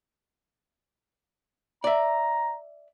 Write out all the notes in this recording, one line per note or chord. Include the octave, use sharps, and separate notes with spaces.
D5 E5 A#5